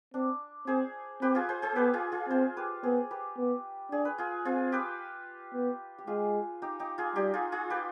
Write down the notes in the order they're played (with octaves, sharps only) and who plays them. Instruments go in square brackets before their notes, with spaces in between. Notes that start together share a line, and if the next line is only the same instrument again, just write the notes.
[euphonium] C4 [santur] D4
[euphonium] C4 [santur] G#4 C5
[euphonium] C4 [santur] G4 B4
[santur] F4 G#4
G#4 C5
G#4 C5
[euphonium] B3 [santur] G4 B4
[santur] F4 G#4
F4 G#4
[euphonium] C4 [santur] G#4 C5
[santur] G4 B4
[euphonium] B3 [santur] G#4 C5
[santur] G4 B4
[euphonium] B3
[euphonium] D4 [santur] G#4
[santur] B4
F4 G#4
[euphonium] C4 [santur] F4 G#4
[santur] G4 B4
[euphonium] B3
[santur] G4
[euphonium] G#3 [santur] F4 G#4
[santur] D#4 G4
D#4 G4
F4 G#4
[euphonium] G3 [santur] D#4 G4
[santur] F4 G#4
F4 G#4
G4 B4